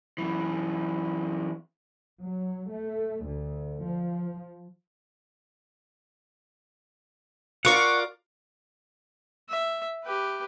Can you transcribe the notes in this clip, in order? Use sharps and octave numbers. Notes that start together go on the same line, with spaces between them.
F#2 E3
F#3
A3
D2
F3
F4 A#4 D5 F#5 C#6
E5
G4 B4